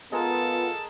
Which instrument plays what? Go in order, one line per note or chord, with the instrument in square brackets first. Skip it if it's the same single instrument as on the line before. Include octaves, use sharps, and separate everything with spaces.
[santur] G#3 A#4 G#5 [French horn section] B3 F4 [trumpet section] A4 A5